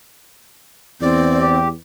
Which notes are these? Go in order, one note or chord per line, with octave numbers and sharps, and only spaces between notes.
E2 C4 D5
G4